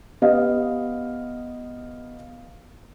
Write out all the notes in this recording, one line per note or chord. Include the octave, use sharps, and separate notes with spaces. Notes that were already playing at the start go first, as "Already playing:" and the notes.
B3 G4 D#5 F5